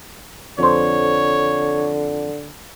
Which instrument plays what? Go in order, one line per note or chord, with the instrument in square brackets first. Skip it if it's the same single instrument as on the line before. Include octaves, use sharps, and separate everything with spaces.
[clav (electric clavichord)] F2 C5 [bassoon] D3 [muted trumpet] C#5